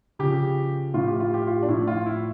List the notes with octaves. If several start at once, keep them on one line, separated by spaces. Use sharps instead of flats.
C#3 F3 G4
A2 F3 F4
G4
F4
G4
F4
D4
A2 F3 E4
F4
E4